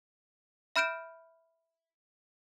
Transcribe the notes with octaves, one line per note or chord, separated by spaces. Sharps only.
E5 B5 F6 G6 D7 E7